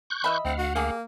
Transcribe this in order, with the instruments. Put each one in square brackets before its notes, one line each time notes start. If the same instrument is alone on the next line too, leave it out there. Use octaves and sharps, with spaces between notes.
[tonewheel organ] C#6 F#6 G6
[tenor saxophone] E3 [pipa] D#5 E5 B5
[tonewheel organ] D2 F5 F#5 [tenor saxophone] C4
[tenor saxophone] F#4
[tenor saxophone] A#3 [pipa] G4 G#4